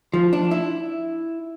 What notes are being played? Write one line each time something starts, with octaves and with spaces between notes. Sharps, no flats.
F3
D4
E4